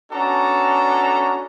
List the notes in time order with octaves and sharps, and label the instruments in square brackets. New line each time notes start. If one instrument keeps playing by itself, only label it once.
[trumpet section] B3 C#4 D4 F#4 A4 A#5